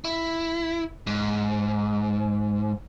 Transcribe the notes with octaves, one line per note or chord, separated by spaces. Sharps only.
E4
G#2